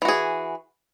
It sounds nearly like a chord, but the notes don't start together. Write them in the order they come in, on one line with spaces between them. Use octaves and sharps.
E3 F#4 G#4